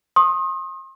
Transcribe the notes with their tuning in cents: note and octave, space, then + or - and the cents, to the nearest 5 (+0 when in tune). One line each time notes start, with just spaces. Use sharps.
C6 +40 D#6 +0